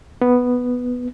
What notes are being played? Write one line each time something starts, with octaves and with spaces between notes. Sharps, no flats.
B3